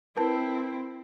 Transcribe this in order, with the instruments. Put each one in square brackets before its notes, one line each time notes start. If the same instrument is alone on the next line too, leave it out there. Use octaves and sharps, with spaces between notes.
[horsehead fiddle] C4 E4 [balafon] A#4 B4 A5